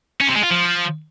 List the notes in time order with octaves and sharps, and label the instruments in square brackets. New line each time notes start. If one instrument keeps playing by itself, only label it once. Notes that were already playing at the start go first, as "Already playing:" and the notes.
[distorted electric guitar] C#4
C3
G#3
F4
F3